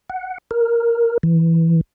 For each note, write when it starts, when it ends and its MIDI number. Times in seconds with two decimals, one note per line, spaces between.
0.10 0.38 78
0.51 1.18 70
1.23 1.81 52